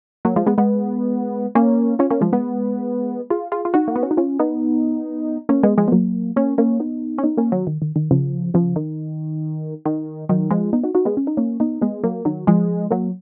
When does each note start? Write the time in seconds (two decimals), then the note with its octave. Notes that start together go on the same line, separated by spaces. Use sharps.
0.25 F#3 A#3
0.36 F3 G#3
0.46 G#3 B3
0.58 G#3 B3
1.55 A#3 C#4
1.99 C#4 F4
2.10 A#3 C#4
2.21 F3 G#3
2.33 G#3 B3
3.30 F4 G#4
3.52 F4 G#4
3.65 F4
3.74 D#4 F#4
3.88 A#3
3.96 B3
4.03 C#4
4.11 D#4
4.17 C#4 F4
4.39 B3 D#4
5.49 A#3 C#4
5.63 G#3 B3
5.78 F3 G#3
5.88 B3
5.92 F#3 A#3
6.36 A#3 C#4
6.58 A#3 C#4
6.80 B3 D#4
7.18 C#4
7.23 B3 D#4
7.37 A#3 C#4
7.52 D#3 F#3
7.67 D#3
7.82 D#3
7.96 D#3
8.11 C#3 F3
8.54 C#3 F3
8.76 D#3
9.85 D#3
10.29 D#3 F#3
10.51 F3 G#3
10.73 B3 D#4
10.84 D#4 F#4
10.95 D#4 F#4
11.05 G#3 B3
11.17 C#4
11.27 D#4
11.37 A#3 C#4
11.60 B3 D#4
11.81 G#3 B3
12.03 F#3 A#3
12.25 D#3 F#3
12.47 F3 G#3
12.91 F#3 A#3